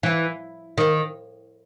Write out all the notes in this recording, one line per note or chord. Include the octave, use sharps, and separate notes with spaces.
E3
D#3